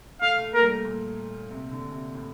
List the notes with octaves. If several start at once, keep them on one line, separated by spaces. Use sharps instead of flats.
A3 F5
A3
A#3 A#4
G3
A3
A#2
C3
D3
C3
A2